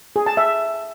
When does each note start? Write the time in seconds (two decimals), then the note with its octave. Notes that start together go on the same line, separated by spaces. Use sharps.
0.16 G#4
0.26 A5
0.37 E5